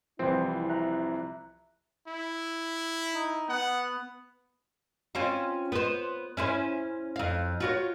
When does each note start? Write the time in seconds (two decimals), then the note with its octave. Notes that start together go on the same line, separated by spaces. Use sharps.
0.19 C2 E3 F3 C4 E4
0.70 E5 A#5 F#6
2.08 E4
3.15 D#4
3.49 B3 F#5
5.15 C4 C#4 F4
5.72 B3 C5
6.37 C#4 E4 C5
7.16 F2 F5
7.60 F4 F#4 C#5